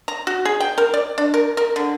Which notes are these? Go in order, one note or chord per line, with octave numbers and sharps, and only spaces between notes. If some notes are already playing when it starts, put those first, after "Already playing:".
A#5
F#4
G#4
G5
A#4
D5
D4
A#4
A#4
D3